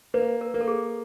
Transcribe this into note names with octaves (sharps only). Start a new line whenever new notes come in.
A#3 B4
A#4
A#3
A4
G#4